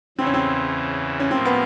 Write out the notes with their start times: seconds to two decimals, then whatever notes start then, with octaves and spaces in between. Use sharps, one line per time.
0.18 E2 C#3 E3 C4
0.27 C#4
0.34 C4
1.20 C#4
1.31 A2 F3 A#3 C4
1.45 B3